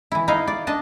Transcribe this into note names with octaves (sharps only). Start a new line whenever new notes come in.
E3 E4
D#4 E4 D#5 F5
D5
D4 D#5 A5